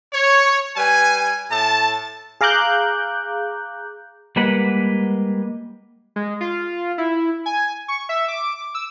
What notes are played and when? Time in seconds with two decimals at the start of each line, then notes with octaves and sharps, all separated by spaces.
0.13 C#5
0.76 G3 B4 G#5
1.50 A2 A5
2.41 G#4 F5 A#5 D6 F#6 G6
4.36 G3 G#3 A#3 B4 F#5
6.16 G#3
6.41 F4
6.98 E4
7.46 G#5
7.88 C#6
8.09 E5
8.28 D6
8.74 E6